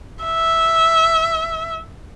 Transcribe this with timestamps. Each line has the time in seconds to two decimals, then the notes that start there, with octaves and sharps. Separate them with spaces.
0.25 E5